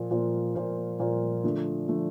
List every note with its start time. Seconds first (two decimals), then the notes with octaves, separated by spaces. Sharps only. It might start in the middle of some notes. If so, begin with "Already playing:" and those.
Already playing: A#2 F3 A#3 F4 C5
0.11 A#2 F3 A#3 F4 C5
0.55 A#2 F3 A#3 F4 C5
0.99 A#2 F3 A#3 F4 C5
1.44 D3 F3 A3
1.89 D3 F3 A3